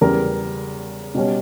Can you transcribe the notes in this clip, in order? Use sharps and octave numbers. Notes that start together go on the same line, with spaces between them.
E2 C#3 G3 A#4
B2 G3 C#4